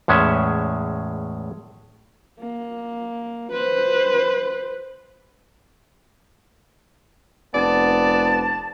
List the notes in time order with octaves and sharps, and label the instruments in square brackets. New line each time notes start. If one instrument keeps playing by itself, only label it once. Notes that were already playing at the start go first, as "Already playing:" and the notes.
[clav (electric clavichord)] E2 A2 G#3 C#4 E5
[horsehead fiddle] A#3
B4 C5
[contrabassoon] F1 [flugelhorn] B3 [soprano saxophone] D5 [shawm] A5